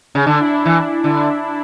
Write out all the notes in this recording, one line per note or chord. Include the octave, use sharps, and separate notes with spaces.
C#3
D3 D4
E4
D4
E3
D3